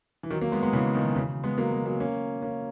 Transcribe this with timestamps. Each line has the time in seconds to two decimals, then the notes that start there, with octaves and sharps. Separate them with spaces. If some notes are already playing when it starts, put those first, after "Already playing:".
0.23 E3
0.30 D#3 F#3
0.41 F#3 A#3
0.52 G#3 B3
0.62 G#3 B3
0.73 C#3 E3
0.94 B2 D#3
1.16 C#3 E3
1.44 G#3 B3
1.58 F#3 A#3
1.72 G#3 B3
1.86 F#3 A#3
2.00 A#3 C#4
2.42 A#3 C#4